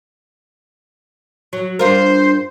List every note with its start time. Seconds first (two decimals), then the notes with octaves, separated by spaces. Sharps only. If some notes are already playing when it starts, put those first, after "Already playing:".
1.53 F#3
1.79 G2 F4 A#4 C5